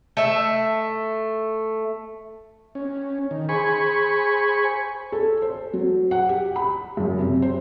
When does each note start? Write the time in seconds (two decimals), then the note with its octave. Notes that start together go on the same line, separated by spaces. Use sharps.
0.17 A3 E5
2.75 C#4
3.31 D#3
3.49 G#4 C5 G#5 B5 C#6
5.12 A4
5.42 C5
5.73 F#3
6.11 F#5
6.29 G4
6.56 B5
6.97 F#2
7.20 C3
7.42 C5